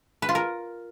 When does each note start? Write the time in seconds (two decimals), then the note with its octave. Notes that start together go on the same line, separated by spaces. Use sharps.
0.22 B4
0.29 F4
0.35 A#4